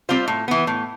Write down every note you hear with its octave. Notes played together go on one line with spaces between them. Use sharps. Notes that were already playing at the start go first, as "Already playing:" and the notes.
G3 C4 F4 C5
A2
E3 B3
A2